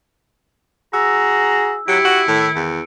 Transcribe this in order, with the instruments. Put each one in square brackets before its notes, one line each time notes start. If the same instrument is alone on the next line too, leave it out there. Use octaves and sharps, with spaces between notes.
[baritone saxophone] F#4 [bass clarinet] G#4 [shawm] A#5 [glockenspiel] E6
[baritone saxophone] F#3 [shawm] E4 [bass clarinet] G4 [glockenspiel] C#7 D7
[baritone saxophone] F#4
[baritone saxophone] A2 [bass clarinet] D#3
[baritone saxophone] E2